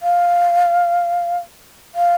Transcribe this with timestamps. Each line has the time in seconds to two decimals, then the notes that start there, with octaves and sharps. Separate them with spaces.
0.03 F5
1.95 F5